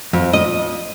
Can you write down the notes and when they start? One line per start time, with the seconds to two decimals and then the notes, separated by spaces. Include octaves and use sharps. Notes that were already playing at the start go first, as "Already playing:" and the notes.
0.13 F2
0.33 D#5